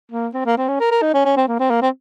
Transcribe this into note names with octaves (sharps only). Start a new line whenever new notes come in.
A#3
C4
A#3
C4
C#4
A#4
A#4
D#4
C#4
C#4
C4
A#3
C4
A#3
C4